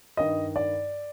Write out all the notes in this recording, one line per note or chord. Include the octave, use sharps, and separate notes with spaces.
G2 D#3 D#5
D5